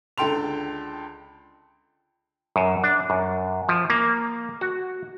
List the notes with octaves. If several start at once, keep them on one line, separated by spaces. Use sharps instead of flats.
C#2 D3 A4 G5 C6 F7
F#2
D4
F#2
F3
A#3
F#4